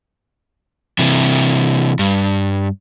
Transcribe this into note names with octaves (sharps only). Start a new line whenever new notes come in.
C3 E3
G2